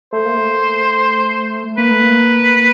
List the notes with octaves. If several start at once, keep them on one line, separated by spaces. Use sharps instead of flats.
A3 C5
A#3
A3
A#3 B4
A3
A#3